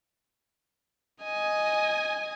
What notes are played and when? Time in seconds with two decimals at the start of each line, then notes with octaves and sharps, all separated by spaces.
1.24 D#5 G#5